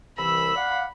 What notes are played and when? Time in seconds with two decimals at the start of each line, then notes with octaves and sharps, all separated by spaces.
0.17 C2 E3 B5 E6
0.55 D5 F5 F#5